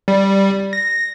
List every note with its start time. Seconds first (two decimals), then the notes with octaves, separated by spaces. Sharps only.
0.08 G3
0.73 A#6